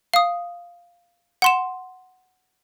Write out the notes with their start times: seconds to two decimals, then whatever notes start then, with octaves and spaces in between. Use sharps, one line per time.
0.14 F5 D#6
1.42 F#5 C6 E7